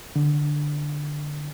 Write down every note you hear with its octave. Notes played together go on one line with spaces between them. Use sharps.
D3